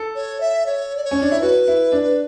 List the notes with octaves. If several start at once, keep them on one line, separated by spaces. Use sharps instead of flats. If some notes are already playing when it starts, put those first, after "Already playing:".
Already playing: A4
C#5
E5
C#5
D5
C#5
C#4
D4
E4
F#4 B4
E4
D4